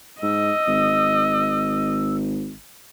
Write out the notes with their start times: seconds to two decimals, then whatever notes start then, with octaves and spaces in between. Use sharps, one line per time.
0.23 G#2 D#5 E6
0.67 G#1